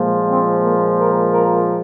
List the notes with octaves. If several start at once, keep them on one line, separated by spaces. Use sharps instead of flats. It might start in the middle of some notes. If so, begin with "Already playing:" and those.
Already playing: A#2 F3 G#3
C4
A#3
A#4
A#4